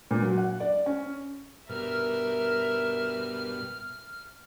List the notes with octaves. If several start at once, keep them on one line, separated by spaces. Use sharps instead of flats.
A#2
F#3
F#5
D5
C#4
G2 B2 A#4 E5 F6